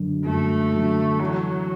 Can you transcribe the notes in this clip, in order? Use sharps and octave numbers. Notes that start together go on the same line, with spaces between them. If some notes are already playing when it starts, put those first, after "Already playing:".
Already playing: F#2 D3 F#3
F#2 A3
D3 F#3
E3 F#3